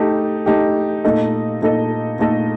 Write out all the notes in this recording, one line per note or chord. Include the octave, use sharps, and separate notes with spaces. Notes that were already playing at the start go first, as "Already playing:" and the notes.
Already playing: A3 D#4 G4
A3 D#4 G4
A#2 A3 D#4 A4 D#5
A#2 A3 D#4 A4 D#5
A#2 A3 D#4 A4 D#5